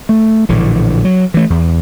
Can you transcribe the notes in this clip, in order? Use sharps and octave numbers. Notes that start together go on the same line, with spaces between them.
A3
A#1 A2 D3 E3
F#3
E3 A3
E2